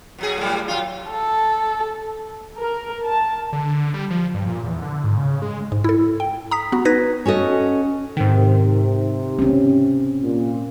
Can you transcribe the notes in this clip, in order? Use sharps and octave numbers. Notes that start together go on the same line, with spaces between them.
B2 F#3 G#4
A2 G3
F#3 F4
A4
A#4
A5
D3
G3
F3
G2
A#2
E2
D3
G#2
C#3
G#3
G#2
E4 A4
G5
A#5 D#6 B6
B3 F#4
D#4 B4 G#6 A#6 B6
C#4 F#4 A4 D#5
G#2 C3 D#3
C4 C#4
A#2